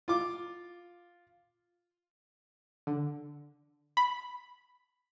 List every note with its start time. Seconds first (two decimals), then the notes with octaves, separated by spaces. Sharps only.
0.08 F4 D6
2.87 D3
3.97 B5